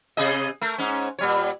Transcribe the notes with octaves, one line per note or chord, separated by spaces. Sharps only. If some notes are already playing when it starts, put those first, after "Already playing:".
C3 G#4 D#5
A3 A#4
G#2 C#4
A#2 G3 C#5